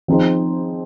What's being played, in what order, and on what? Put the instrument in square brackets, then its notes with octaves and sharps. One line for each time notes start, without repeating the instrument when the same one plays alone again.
[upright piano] F3 C4 D#4 G#4 C5